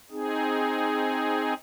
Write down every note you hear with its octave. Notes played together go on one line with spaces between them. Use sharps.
C4 D#4 G#4